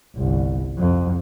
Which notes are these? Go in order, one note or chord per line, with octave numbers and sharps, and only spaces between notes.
G1 C2
F2